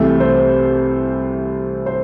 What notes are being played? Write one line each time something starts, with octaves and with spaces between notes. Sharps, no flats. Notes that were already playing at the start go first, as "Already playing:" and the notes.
Already playing: C2 C3 E3 A3
C5
C5